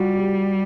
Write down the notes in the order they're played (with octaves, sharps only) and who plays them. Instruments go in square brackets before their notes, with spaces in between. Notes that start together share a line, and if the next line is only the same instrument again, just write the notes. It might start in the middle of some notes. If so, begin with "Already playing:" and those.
Already playing: [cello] G3 [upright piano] F4 F#4
[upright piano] G4